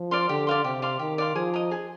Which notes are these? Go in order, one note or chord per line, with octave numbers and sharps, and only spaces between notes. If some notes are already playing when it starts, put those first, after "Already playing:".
Already playing: F3
D5 F5 C6
D3 G4
D5 F5 C6
C3 G4
D5 F5 C6
D#3 G4
D5 F5 C6
F3 G#4
D#5 A#5
G#4